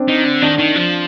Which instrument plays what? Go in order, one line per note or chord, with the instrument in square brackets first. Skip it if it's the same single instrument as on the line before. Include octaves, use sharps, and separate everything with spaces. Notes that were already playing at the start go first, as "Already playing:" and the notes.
Already playing: [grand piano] C4 D4
[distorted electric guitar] D#3
D3
[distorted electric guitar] D#3 [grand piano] D4
[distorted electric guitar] D#3
F3